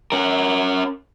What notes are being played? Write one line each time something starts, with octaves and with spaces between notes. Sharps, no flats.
C#4 A#4